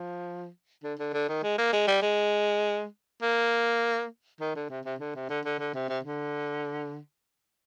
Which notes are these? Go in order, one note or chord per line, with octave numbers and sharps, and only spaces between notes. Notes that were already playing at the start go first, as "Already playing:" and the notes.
Already playing: F3
D3
D3
D3
D#3
G#3
A#3
G#3
G3
G#3
A#3
D#3
D3
C3
C3
D3
C3
D3
D3
D3
C3
C3
D3